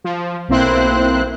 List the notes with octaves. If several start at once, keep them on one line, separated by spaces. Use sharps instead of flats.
F3
B1 A#3 C4 E4 C5 F#6